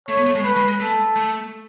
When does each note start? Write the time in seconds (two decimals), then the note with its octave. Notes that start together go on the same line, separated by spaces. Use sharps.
0.08 A3 C#5
0.17 B3
0.26 A3
0.35 G#3
0.44 A3 B4
0.56 G#3
0.68 G#3
0.80 A3 A4
1.16 A3